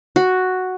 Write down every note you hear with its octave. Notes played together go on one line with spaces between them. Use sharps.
F#4